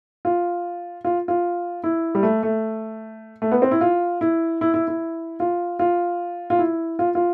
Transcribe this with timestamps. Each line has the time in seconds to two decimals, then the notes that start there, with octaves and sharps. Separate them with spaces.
0.25 F4
1.05 F4
1.28 F4
1.84 E4
2.15 G3
2.23 A3
2.43 A3
3.42 A3
3.52 B3
3.62 C4
3.71 E4
3.81 F4
4.21 E4
4.61 E4
4.74 E4
4.88 E4
5.40 F4
5.79 F4
6.50 F4
6.59 E4
6.99 F4
7.15 F4